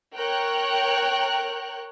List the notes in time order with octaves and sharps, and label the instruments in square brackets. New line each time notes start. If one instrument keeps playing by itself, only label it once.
[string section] A#4 C#5 G5 F#6